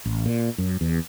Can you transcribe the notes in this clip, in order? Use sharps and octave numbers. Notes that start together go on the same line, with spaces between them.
A1
A#2
F#2
E2